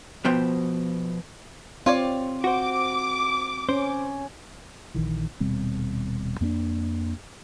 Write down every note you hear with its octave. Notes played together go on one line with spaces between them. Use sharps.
B2 F3 B3 C5 G5
C4 F4 C#5 D5
F#4 C5 D6
C#4 C5
A#1 D#3 E3
D#1 B2 G3 C4
F2 A#3 B3 D4